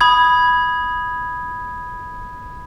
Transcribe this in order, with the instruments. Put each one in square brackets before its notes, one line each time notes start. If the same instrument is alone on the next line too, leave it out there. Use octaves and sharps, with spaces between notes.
[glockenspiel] B5 D#6 G#6